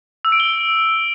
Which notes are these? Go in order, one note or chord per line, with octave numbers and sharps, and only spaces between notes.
E6
D7
G7